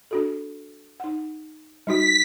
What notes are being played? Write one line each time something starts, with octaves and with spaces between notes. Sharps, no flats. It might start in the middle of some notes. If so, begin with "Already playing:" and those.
D4 F#4 A4
D#4 F#5
G3 D#4 F#4 B6